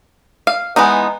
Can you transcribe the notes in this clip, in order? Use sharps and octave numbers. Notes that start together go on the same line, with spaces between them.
F5
E3 G#3 B3 D#4